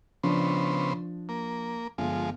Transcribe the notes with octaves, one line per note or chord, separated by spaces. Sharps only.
C#3 F3 B3 D4 C5
A#3
G1 F3 G#3